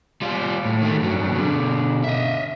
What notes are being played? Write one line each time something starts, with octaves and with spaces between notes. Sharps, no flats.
G3 F4
A2
D#3 A3
G2 F#3
B2 D3
D#5 E5